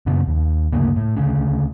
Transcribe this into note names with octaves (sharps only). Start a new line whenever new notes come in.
F#2 A#2 C#3 B3
D#2
G1 D2 C#3 A#3
A2
D2 C#3